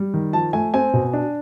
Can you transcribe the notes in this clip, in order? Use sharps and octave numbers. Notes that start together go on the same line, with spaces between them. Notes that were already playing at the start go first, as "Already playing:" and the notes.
Already playing: G3
D#3
F3 A5
A3 G#5
C4 G#5
B2
D4